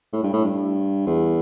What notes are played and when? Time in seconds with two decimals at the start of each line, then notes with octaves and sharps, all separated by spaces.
0.13 A2
0.23 G2
0.33 A2
0.44 G2
1.07 E2